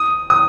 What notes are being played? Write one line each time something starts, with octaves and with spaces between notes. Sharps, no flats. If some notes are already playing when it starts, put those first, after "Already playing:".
Already playing: D#6
D#6